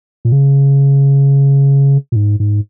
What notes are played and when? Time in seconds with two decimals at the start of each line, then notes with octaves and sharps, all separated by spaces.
0.25 A#2
0.32 C#3
2.12 A#2
2.16 G#2
2.40 G#2